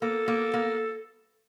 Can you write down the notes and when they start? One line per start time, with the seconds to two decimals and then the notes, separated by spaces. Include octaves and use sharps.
0.02 A#3 A4
0.28 A#3
0.54 A#3